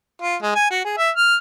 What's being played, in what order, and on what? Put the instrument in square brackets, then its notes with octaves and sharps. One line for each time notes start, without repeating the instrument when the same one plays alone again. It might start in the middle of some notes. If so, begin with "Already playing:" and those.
[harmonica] F4
G#3
G#5
F#4
G#4
E5
F6